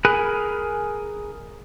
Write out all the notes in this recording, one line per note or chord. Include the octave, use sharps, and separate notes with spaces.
G#4 A#4 G#5 B5 F#6